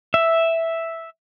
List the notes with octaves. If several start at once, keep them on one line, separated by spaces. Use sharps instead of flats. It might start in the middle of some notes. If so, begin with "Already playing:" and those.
E5